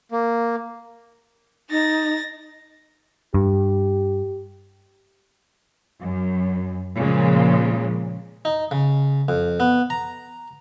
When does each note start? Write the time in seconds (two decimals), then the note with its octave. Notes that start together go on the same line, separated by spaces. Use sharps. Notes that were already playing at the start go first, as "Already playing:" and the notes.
0.12 A#3
1.70 D#4 A6 A#6
3.34 G2 G4
6.01 F#2
6.97 A#2 C#3 F3 G#3
8.45 D#4
8.71 C#3
9.28 F2
9.60 B3
9.90 A#5